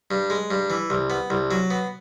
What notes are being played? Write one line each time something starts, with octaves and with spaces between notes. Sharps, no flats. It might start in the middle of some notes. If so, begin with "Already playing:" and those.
G2
G#3
G2
E3
C2
B3
C2
F#3
B3